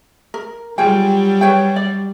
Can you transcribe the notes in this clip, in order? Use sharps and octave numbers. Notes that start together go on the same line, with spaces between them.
A#4
F#3 G3 F4 G#4 G5
B4 C#5 G5
D5